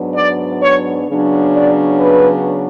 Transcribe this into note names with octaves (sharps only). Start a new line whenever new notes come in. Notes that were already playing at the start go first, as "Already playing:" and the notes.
Already playing: G#2 F#3 B3 D4
D5
C#5
C#3 F#3 B3 D4
D5
B4